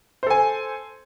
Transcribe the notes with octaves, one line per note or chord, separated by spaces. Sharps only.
A4 C5 G#5